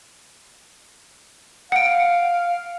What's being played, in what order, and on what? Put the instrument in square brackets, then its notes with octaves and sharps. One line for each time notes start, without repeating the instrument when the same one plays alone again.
[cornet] F5 [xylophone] F#5 D7